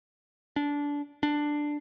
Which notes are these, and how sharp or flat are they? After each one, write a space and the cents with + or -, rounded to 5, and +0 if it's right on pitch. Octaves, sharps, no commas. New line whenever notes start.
D4 -20
D4 +5